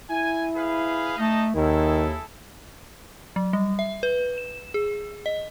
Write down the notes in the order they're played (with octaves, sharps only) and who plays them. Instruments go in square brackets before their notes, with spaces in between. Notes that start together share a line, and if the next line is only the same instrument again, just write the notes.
[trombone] E4 [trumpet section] G#5
[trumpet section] G#4 B4 F5
[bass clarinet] A3 [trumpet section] D#4 D#5 A5
[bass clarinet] D#2 [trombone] D#3 [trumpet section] E4 G#4 A4
[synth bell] F#3
G3
E5
B4
E7
G#4
D#5